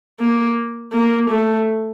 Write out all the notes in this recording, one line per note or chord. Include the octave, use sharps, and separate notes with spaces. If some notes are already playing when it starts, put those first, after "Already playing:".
A#3
A#3
A3